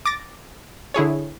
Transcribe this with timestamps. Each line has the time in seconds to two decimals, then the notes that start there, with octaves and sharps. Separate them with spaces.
0.06 D6 A6 A#6
0.94 D3 E4 G#4 C#5